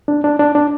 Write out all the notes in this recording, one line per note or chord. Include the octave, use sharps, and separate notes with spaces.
D4
D4
D4
D4